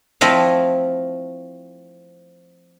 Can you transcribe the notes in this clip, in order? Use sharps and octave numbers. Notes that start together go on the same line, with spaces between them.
F3 A3 C4 E4 D#5 F5